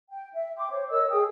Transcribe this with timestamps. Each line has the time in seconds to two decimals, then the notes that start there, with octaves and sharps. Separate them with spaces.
0.10 G5
0.33 E5
0.56 G5 C6 D6
0.70 C5 C#5
0.89 A#4 C#5 D#5 E6
1.09 G#4 A#4 G5 D#6